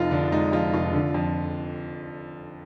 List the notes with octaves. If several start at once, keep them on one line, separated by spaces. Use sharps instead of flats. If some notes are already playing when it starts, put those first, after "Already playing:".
Already playing: F1 F2 D#4 F4
D3 D4
G#3 D#4
F2 F4
F1 F4
D3
F2